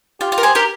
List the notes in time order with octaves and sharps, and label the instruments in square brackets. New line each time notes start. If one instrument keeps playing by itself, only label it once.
[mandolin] F4 [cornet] G4
[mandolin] F4
A#4
G#4 C5
G4 A#4